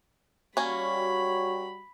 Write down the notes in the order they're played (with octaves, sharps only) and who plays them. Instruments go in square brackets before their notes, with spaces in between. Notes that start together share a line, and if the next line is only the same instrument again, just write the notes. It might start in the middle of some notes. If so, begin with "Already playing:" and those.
[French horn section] G3 F#4 [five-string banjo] A#3 C#4 [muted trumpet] C#5 [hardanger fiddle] B5